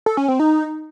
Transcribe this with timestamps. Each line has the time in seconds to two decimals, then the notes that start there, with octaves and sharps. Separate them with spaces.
0.06 A4
0.17 C#4
0.28 C4
0.39 D#4